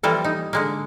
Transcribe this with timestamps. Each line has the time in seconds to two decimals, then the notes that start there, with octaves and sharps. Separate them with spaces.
0.03 E3 F3 G3 A#3 A4
0.24 D#4
0.53 D3 G#3 A#3